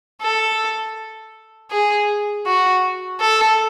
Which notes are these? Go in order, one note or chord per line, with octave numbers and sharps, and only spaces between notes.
A4
G#4
F#4
A4